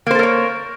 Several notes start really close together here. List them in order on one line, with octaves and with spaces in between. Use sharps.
A#3 C5 A4 A#4 C#5